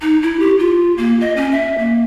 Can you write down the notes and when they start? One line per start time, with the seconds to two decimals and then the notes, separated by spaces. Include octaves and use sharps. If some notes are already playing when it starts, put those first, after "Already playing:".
0.01 D#4
0.23 E4
0.39 G4
0.59 F4
0.97 A#3
1.20 D#5
1.36 C#4
1.51 E5
1.78 A#3